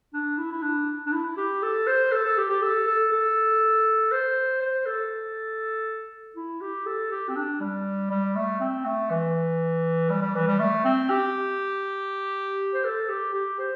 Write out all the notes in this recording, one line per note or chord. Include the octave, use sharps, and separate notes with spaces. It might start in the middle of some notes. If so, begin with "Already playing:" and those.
D4
E4
E4
D4
D4
E4
G4
A4
C5
A4
A4
G4
G4
A4
A4
A4
C5
C5
A4
E4
G4
A4
G4
C4
D4
G3
G3
A3
C4
A3
E3
G3
G3
E3
G3
A3
C4
G4
C5
A4
G4
G4
C5